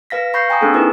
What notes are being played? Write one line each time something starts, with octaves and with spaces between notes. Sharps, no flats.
B4 F5 A#6 B6
F5 B5 C#6 G6 A#6 C7
G5 G#5 A#5 C#6 D#6
A#3 C4 D4 G#4 A4
D#4 E4 B4